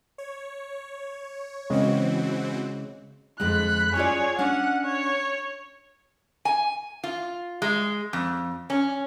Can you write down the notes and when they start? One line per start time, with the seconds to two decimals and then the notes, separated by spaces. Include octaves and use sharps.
0.18 C#5
1.70 C#3 E3 G#3 C4 F#4
3.40 F2 D3 G#3 B5 F#6
3.95 C#4 F4 G#4 C#5 D5
4.38 C#4 D4 F#5
4.85 C#5
6.45 G#5
7.04 F4
7.62 G#3
8.13 F2
8.70 C#4